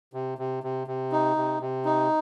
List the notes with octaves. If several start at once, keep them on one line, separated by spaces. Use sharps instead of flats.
C3
C3
C3
C3
D#4
C3
C3
D#4